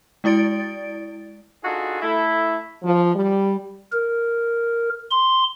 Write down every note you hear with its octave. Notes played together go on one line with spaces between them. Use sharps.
G#3 E4 D5 A6 D7
D4 D#4 F4 F#4 G#4 A4
A3 E4
F3
G3
A#4
C6